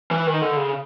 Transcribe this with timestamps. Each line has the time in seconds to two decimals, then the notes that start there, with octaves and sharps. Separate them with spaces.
0.11 E3
0.27 D#3
0.42 D3
0.56 C#3